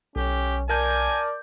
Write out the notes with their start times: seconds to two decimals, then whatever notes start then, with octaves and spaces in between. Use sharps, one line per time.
0.16 B1 C#4 G4
0.69 A#4 D5 G#5 A5 G6